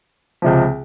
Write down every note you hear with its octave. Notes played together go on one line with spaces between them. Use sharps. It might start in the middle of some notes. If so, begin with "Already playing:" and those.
C#2 C3 F3